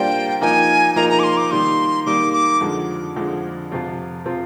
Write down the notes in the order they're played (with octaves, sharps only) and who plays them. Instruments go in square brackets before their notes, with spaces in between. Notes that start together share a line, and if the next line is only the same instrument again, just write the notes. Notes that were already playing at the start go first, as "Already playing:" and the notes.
Already playing: [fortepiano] G3 A#3 D4 F4 C5 [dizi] G5
[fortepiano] F3 A#3 D#4 A#4 [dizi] G#5
[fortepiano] F3 A#3 D#4 A#4 [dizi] A#5
[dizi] A#5
D6
C6
D6
[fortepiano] D#3 G3 A#3 [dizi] C6
[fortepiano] D#3 G3 A#3 [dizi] D6
[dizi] D6
[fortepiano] F2 D3 F3 G#3
F2 D3 F3 G#3
F2 C3 F3 C4 F4
C3 F3 C4 F4